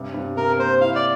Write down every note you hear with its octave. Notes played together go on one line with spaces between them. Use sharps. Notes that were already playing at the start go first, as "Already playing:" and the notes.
Already playing: G2 C3
G2
C3 A#4
A#3 C5
E4 F5
D5